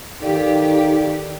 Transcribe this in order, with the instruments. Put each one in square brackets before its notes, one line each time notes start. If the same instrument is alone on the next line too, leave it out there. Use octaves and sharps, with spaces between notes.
[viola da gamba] D#3 [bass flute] D#4 [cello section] G4 [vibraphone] A4 D5 F5